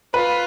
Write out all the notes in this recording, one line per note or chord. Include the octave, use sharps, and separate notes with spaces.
F4 B4